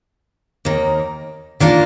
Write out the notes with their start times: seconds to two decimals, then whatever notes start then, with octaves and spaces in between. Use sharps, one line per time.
0.65 D#2 D#3 A#3
1.60 D#3 A#3 D4 F4 A#4